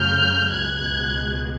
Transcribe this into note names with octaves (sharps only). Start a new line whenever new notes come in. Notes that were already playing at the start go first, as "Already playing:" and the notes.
Already playing: F#2 C#3 F#3 A3 F6 G6
C#2 B2 G#3 F#6 G#6